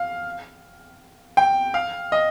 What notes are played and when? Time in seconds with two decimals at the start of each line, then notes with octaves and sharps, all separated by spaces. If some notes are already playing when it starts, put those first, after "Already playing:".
Already playing: F5
1.37 G5
1.74 F5
2.12 D#5